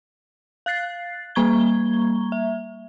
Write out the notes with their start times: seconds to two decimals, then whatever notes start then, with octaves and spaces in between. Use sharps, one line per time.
0.66 F5 F#6 A6 C7
1.35 G3 A#3 A#5 C#6 G#6 G7
2.32 E5